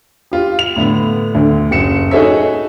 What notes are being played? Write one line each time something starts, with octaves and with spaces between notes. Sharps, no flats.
F4 G4
F7
A2 D3 B3
D2 D3
F#1 C#7 E7
D#4 F#4 G#4 A4 C#5 E5